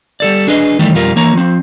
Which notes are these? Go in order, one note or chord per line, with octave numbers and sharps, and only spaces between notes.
G3 A4 D5
D4 G#4 B4 D#5
D#3 E3 G3 A3 G4
B1 F2 G3 F4 A#4
E3 A#3 C#5 A#5
F3 C4